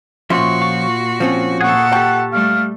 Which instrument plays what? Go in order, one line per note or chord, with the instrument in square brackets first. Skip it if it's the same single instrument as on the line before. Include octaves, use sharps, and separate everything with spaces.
[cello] A#2 F#4 [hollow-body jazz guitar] F3 C#4 [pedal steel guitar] E5 C6 C#6
[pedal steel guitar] F4 F5 C#6
[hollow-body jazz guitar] F3 C4 C#4
[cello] A#2 A4 [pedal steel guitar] G#4 C#6 [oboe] F#5
[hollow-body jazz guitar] G4 G5 [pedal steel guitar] A5 C#6
[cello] G3 A3 [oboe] F5